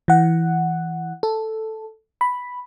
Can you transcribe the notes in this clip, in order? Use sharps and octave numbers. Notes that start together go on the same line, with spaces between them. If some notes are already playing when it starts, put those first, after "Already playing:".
E3 F#5
A4
B5